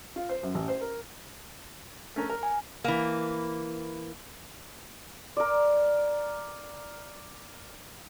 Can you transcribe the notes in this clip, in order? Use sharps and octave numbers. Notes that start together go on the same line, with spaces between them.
F4
C5
F#2
A1
C5
A#4
A3 C#4 A#4
A#4
G#5
E3 A#3
A#4 D5